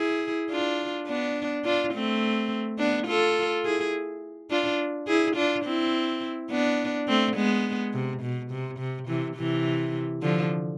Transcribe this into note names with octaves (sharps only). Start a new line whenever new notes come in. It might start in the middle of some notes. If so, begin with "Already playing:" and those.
Already playing: E4 G#4
D4 F4
B3 D4
D4 F4
A3 C4
B3 D4
F4 A4
E4 G#4
D4 F4
E4 G#4
D4 F4
C4 E4
B3 D4
A3 C4
G#3 B3
C3
B2
C3
C3
C3 E3
C3 E3
D3 F3